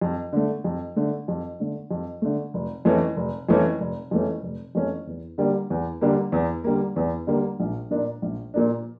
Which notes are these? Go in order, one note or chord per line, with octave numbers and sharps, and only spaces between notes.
F2
D3 A3
F2
D3 A3
F2
D3 A3
F2
D3 A3
F1
F2 E3 A3 C#4
F1
F2 E3 A3 C#4
F1
F2 E3 A3 C#4
F1
F2 E3 A3 C#4
E2
D3 G3 A#3
E2
D3 G3 A#3
E2
D3 G3 A#3
E2
D3 G3 A#3
A#1
A#2 F3 A#3 D4
A#1
A#2 F3 A#3 D4